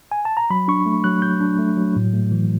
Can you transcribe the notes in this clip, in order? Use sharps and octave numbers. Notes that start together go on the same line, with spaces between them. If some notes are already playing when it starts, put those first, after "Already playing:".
G#5
A5
A#5
F#3 B5
D4 C#6
A3
F#3 F#6
F#3 G6
D4
A3
F#3
A2
A3
E3